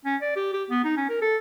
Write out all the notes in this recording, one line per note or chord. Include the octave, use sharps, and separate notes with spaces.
C#4
D5
G4
G4
B3
D#4
C#4
A#4
A4